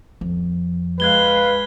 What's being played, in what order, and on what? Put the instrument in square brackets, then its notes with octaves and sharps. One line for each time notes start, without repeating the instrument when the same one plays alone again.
[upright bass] F2
[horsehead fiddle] G#3 F5 [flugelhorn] B4 [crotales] F#6 G#6 G7